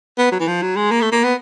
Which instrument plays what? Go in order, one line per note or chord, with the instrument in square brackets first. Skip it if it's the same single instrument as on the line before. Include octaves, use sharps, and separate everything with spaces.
[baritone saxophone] B3
F#3
E3
F3
F#3
G#3
A#3
A3
A#3
B3